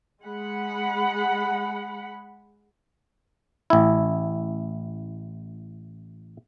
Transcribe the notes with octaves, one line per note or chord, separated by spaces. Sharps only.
G#3 F#5 B5
A1 E4